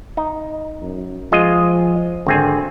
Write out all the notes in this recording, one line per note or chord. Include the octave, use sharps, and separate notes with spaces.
D#4
F#2
F3 G#3 F4 D#5
G#1 D3 C4 G#5